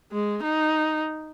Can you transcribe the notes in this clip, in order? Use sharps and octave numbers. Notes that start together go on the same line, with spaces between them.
G#3
D#4